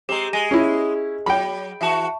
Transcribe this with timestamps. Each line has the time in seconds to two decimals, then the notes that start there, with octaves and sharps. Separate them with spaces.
0.09 G#3 C4 G4 A#5
0.33 G#3 G#5 A#6 D#7
0.51 C#4 E4
1.26 F#3 G5 B5
1.81 E3 F#4 E5 A5 C#6